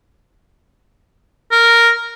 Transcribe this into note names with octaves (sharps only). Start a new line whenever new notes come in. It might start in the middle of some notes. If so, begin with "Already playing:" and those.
A#4